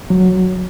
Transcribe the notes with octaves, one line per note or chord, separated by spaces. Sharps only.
F#3